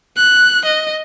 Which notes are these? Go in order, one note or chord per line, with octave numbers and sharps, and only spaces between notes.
F#6
D#5